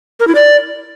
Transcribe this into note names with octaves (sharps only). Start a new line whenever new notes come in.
A#4
E4
D5